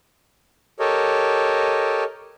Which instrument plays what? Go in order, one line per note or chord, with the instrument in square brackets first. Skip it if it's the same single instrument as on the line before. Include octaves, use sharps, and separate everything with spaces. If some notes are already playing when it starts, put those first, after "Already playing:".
[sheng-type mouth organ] G4 A4 A#4 C#5 D#5